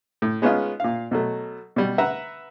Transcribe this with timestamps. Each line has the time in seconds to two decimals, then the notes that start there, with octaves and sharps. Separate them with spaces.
0.22 A2
0.42 G#3 B3 C#4 D#4 F4
0.80 A#2 F5
1.11 B2 F#3 A3
1.76 B2 G3
1.98 B4 E5 F#5 A#5